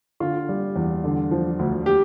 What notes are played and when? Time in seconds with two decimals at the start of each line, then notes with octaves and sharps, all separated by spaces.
0.20 D3 F4
0.49 G3
0.76 E2
1.04 D3
1.31 F3
1.59 D2
1.86 G4